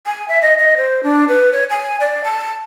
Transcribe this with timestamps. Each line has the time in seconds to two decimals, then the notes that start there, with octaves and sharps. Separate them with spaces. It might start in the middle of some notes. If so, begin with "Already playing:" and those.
0.06 G#5
0.28 E5
0.42 D#5
0.58 D#5
0.77 C5
1.03 D4
1.28 B4
1.53 C#5
1.70 G#5
2.00 D5
2.24 A5